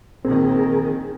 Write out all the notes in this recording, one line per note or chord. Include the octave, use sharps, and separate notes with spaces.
A#1 D#3 C4 G#4 A#4